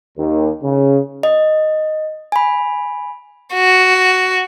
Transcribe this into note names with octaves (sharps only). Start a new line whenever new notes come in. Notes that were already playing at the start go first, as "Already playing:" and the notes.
D#2
C#3
D#5
G#5 B5
F#4